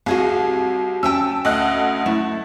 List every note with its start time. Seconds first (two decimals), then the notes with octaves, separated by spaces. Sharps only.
0.06 C2 F#4 G#4 F5
1.03 C#4 E5 G5 A5 E6
1.45 D2 D#5 F#6
2.06 A3 E4